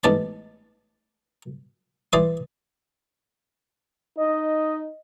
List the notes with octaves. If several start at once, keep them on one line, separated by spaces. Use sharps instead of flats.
A1 G#2 B3 D5 A5 B5
E3 D5 E5 B5 C6 D#6
D#4 D#5